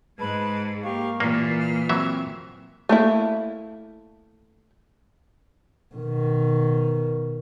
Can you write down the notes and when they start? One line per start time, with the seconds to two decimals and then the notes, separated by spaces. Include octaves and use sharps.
0.18 G#2 G#3 B4 A5 G#6
0.84 A#3 G4 F5 C#6
1.20 A#2 E3 A#3 D5
1.58 F6
1.89 E3 F#3 C4 E5
2.89 A3 A#3 E4
5.95 B2 D#3